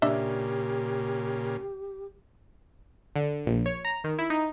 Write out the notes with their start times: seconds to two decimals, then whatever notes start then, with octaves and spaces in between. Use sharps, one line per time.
0.02 A#2 C#3 D4 G4 E5
3.16 D3
3.46 A#1
3.66 C#5
3.85 A#5
4.04 D#3
4.19 E4
4.30 D#4